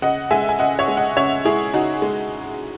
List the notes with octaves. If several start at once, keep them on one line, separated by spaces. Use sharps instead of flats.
C#3 D#5 F#5
G#3 E5 G#5
G#5
C#3 D#5 F#5
C#5 E5
G#3
D#5 F#5
C#3 C#5 E5
G#3 E4 G#4
C#3 D#4 F#4
G#3